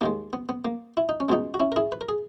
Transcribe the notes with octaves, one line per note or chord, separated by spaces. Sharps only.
D#2 D#3 G#3 A#3
B3
B3
A#3
E4
D#4
C#4
C#2 B2 G#3 B3 D#4
F#4
C#4 E4
A#4
E4 G#4
B4
A#4
G#4